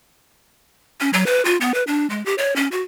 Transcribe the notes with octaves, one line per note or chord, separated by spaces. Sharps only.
C#4
F#3
B4
F4
B3
B4
D4
G#3
G4
C#5
C#4
F#4